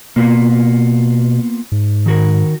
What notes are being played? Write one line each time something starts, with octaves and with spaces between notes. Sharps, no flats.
B2 A#3 B3 F4
G#2
D#3 F#4 A#4